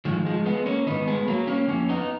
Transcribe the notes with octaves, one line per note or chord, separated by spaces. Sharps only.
G#2 D#3 F3 G#3
F3 G#3
G#3 B3
A#3 C#4
G#2 D#3 B3 D#4
G#3 B3
F#3 A#3
A#3 C#4
F2 D#3 A#3 C#4
B3 D#4